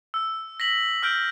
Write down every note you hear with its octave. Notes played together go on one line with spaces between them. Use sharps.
E6
A#6 B6 F#7
E6 F6 G6 D7